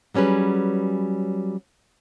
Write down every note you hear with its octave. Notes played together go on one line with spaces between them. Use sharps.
F#3 G3 C#4 G#4 B4